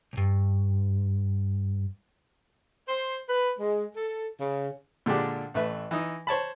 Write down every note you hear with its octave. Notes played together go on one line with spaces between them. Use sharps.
B1 G2
C5
B4
G#3
A4
C#3
A#2 D3 G#3 D4 G4
A1 A3 B4 E5
E3 D#4
C5 C#5 A5 B5